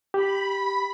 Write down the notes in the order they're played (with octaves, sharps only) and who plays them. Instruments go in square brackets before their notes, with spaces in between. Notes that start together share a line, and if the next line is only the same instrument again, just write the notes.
[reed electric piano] G4 [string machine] B5